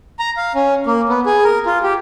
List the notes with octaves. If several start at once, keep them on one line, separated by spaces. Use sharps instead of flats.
A#5
F5
C#4
A#3
B3
G#4
A#4
F4
G4